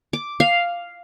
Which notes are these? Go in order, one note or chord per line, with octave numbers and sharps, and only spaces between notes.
D6
F5